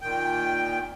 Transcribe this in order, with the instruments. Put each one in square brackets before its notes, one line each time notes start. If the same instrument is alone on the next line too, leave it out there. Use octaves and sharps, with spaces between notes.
[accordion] A#2 D#3 G5